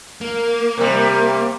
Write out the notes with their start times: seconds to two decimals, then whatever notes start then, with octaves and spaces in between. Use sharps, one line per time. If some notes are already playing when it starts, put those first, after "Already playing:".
0.21 A#3
0.77 C3 G3